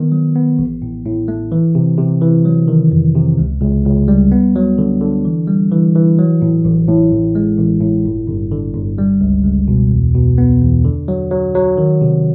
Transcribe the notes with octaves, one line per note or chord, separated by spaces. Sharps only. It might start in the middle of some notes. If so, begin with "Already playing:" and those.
Already playing: D#3 B3
F#3
B3
A1
A2
A2
A3
E3
C3
C3
E3
F#3
D#3
F2
C3
C#2
C#2
C#2
G3
B3
F#3
D3
D3
E3
G3
E3
E3
F#3
A2
A1
A2
A1
G#3
A1
A2
G1
G1
D3
G1
G3
C#2
C#2
B2
E2
B2
B3
E2
D3
F#3
F#3
F#3
D#3
C3